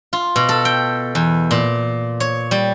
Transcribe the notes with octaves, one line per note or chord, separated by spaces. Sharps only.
F4
B2
A4
G5
E2
A#2
C#5
G3